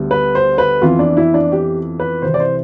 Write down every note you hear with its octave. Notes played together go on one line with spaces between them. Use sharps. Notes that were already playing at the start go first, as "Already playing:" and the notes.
Already playing: D2 D3 G3 B3
B4
C5
B4
F2 E3 B3 F4
D4
E4
D4
G4
B4
C2 C3 E3 C5
D5
C5